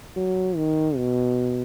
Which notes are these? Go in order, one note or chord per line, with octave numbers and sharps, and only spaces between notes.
F#3
D#3
B2